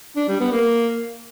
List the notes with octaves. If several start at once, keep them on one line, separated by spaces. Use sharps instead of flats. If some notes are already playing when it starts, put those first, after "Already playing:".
D4
G3
B3
A#3